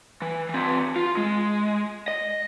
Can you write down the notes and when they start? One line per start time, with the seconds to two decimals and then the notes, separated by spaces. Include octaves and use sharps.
0.22 E3
0.49 E3 C4
0.96 F4
1.17 G#3
2.08 D#5